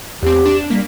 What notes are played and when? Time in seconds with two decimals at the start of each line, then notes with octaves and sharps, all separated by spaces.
0.23 E2 C4 G4
0.46 D4 E7
0.70 G3 A#3 B6